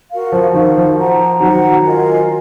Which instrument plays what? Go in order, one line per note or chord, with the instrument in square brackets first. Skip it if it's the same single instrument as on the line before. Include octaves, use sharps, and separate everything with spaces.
[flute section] F#4 A#4 F5
[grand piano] F3
[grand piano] D#3 [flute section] F#4 A#4 F5
[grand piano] F3
[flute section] C5 F#5 A#5
[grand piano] D#3 F#3 [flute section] C5 F#5 A#5
[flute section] F4 A#4 D#5 G#5